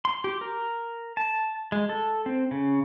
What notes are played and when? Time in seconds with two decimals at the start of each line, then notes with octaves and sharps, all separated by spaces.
0.05 C6
0.24 G4
0.41 A#4
1.17 A5
1.72 G#3
1.89 A4
2.26 C4
2.51 C#3